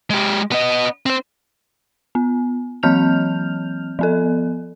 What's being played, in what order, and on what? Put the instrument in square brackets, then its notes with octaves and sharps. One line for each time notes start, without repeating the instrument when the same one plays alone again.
[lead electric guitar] G#3 G4
B3 D#5
C4 C5
[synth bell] B3
E3 F#3 C4 F6 G6 F7
F3 B3 A4